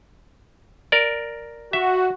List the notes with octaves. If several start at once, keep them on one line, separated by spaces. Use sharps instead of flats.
A#4 D5
F#4 E5